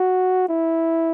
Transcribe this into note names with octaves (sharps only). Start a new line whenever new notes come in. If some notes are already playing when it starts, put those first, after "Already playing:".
Already playing: F#4
E4